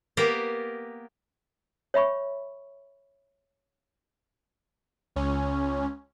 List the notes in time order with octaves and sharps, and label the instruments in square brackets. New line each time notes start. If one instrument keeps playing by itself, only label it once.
[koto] A#3 B3 G4 A#4 B4
[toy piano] C#5 E5 B5 C#6
[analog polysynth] C#2 C#4